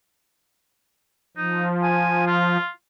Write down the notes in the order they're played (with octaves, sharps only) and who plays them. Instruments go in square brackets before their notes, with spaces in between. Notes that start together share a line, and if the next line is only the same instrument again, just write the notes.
[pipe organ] F3 [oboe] D#4
[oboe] G#5
F4